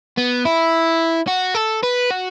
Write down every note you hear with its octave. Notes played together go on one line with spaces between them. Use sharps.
B3
E4
F#4
A4
B4
F#4